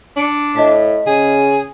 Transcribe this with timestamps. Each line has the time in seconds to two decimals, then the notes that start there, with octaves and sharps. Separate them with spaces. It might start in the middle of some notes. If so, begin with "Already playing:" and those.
0.17 D4 C#7 D7 F#7
0.56 A2 D#5 A5 B6
1.07 C#3 G#4